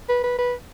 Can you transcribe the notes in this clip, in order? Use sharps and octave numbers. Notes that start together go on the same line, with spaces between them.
B4
B4
B4